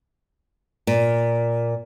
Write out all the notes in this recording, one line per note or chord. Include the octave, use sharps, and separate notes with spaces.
A#2